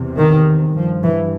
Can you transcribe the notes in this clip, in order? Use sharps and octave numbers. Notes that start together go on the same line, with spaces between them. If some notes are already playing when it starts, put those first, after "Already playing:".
Already playing: E2 C3
D#3
G2 F3
E3